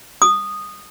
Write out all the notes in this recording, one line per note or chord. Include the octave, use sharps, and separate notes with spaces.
D#6